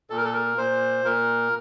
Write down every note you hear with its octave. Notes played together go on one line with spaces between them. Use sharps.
A#2 A4
A#4
A4
A#4
A#2 C5
A#2 A#4